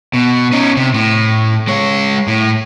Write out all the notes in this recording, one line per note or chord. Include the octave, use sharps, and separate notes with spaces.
B2
C#4 D#4
C3
A2
G#3 C#5
A2